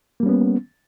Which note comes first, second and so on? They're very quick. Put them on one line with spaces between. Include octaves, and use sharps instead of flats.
A#3 G3 C#4 B3